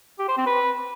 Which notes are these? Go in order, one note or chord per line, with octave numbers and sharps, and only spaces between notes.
G4
C5
C4
B4